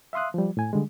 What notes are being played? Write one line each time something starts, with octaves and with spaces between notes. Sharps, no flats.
E5 F5 C6 D#6 F#6
F3 G3
A2 G#5
D3 G3 G#3